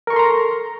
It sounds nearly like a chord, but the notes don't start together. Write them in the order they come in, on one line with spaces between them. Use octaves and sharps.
A#4 C#6 A4 C6 A#5